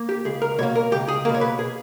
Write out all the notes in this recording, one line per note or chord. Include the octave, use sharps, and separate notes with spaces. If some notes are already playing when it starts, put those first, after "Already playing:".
Already playing: A#3
G4
C#2 G#4
A#4
B2 A#3 C#5
A#4
C#2 G4
G#4
B2 A#3 A#4
C#5
B4
G#4